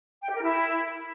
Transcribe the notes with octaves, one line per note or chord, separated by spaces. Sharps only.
G5
G4
A#4
E4